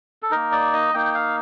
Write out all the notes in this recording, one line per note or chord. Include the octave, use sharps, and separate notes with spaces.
A4
A#3 D#4 A#4
D5
D#5
A#3 D#4 G5
F5